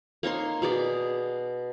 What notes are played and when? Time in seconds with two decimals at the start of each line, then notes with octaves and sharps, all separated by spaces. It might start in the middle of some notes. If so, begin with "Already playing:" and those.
0.23 A#3 D#4 C#5 C6
0.62 B2 G#4 D5